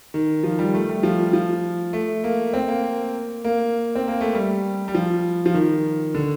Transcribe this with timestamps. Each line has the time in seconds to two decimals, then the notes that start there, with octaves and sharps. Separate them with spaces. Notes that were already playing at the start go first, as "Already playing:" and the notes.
0.14 D#3
0.44 F3
0.59 G3
0.74 A3
0.89 G3
1.03 F3
1.33 F3
1.93 A3
2.24 A#3
2.54 C4
2.68 A#3
3.45 A#3
3.95 C4
4.08 A#3
4.21 A3
4.35 G3
4.88 G3
4.95 F3
5.46 F3
5.54 D#3
6.14 D3